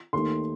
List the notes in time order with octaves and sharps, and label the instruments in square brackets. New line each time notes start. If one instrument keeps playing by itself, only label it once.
[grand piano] D#2 D#3 A3 C6